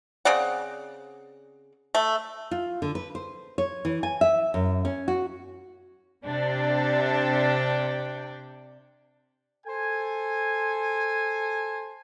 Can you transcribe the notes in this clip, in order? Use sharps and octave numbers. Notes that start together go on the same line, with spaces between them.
C#3 C4 D5 F#5
A3
F4
D3
B4
C5
C#5
E3
G#5
E5
F#2
C#4
F#4
C3 D4 G5
A4 C5 G#5